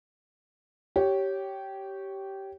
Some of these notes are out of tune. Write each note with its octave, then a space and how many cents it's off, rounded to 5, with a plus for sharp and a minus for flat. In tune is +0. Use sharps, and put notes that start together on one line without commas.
G4 -15 C#5 +0